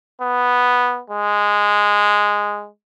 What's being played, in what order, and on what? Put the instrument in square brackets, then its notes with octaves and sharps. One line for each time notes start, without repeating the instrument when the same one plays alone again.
[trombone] B3
G#3